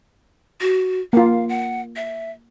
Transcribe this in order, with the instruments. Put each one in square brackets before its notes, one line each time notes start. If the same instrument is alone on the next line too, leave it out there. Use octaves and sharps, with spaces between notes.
[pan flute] F#4
[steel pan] A#3 F4 [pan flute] F5
[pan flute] F#5
E5